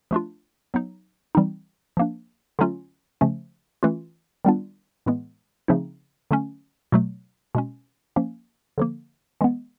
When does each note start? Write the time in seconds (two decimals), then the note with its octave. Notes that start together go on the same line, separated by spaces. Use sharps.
0.11 F3 A3 D4 F4
0.74 F#3 B3 D#4
1.35 E3 G3 C4 D#4
1.97 F3 A#3 D4
2.59 D3 F#3 A3 C#4 F4
3.21 C#3 F3 A3 C#4
3.83 E3 A3 C#4 F4
4.45 D#3 G3 B3 D4 F4
5.06 A2 E3 G#3 B3
5.68 C#3 F3 A3 C4 D#4
6.31 D3 F#3 A3 C#4
6.92 B2 F#3 A3
7.55 B2 G#3 C#4
8.16 F3 A#3 C#4
8.78 D3 F3 A#3
9.41 E3 G#3 B3